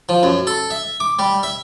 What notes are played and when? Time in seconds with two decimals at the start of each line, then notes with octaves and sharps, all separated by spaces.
0.09 F3
0.23 F#2
0.47 A4
0.70 E5
1.00 D6
1.19 G3
1.43 E5